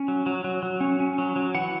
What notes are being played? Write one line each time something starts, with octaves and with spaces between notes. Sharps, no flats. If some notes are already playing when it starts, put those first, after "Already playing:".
Already playing: C#4
F#3
F#3
F#3
F#3
C#4
C#4
F#3
F#3
E3 F#5